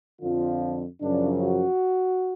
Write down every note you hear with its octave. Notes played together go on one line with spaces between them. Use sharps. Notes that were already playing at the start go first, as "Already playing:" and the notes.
F2 D3 F3 F4
F#2 C#3 F3 D4
F#4